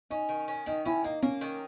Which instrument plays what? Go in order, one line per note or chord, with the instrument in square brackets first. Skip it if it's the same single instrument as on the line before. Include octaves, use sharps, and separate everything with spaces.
[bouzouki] C#4 [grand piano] D#4
[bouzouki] D#3
C#4
[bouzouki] D#3 [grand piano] D#4
[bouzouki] C#4 [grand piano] E4
[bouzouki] A#3 [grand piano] D#4
[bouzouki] A#3 [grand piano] C#4
[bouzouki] D#3